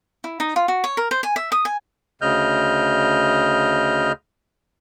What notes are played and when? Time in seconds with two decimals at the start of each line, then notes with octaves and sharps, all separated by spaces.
0.24 E4
0.40 D#4
0.56 F4
0.68 F#4
0.84 C#5
0.97 A#4
1.11 C5
1.23 G#5
1.36 E5
1.52 D#6
1.65 G#5
2.21 D2 C#3 D#5 F6 G6